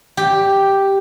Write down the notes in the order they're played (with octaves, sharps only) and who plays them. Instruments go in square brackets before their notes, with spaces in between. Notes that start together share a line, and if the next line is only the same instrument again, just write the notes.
[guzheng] G4